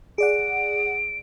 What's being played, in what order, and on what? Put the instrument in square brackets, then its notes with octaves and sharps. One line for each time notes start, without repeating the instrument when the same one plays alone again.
[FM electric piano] G#4 D5 F#5 [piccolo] D7